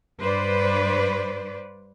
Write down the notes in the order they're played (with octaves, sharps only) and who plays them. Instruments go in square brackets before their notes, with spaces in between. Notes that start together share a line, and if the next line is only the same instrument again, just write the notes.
[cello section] G2 B4 C5 D5